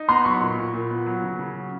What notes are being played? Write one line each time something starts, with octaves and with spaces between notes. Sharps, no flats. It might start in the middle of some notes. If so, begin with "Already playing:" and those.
Already playing: D#4
B3 A#5 C6
F#3 B5 C#6
A#2
A#2
A#2
B3
F#3
C#3
C#3
F#3